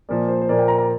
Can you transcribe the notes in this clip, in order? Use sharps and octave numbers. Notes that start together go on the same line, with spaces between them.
A#2 F3 A#3 D5
C5
C5
A#2 F3 A#3 D5
G5
A#5
A#5